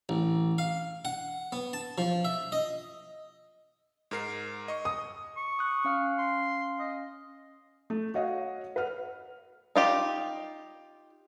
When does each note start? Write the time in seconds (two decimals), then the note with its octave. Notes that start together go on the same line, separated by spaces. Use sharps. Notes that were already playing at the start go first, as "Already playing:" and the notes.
0.09 A1
0.58 F5
1.05 F#5
1.52 B3
1.73 A5
1.98 F3
2.25 E5
2.52 D#5
4.11 G#2 A#4 C7
4.68 D#5 C#6
4.85 D#6
5.37 C#6
5.59 D#6 F#6
5.84 C#4 F5 F6
6.18 C6
6.79 D#5
7.90 A3
8.14 F#4 C#5 D#5 F5 F#5
8.76 B4 F#5 F6
9.76 D#4 F4 G4